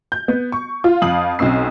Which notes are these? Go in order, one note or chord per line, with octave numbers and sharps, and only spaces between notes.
G6
B3
C#6
F4
F2 F5 D#6 F#7
B1 C4 C#4 E6 C7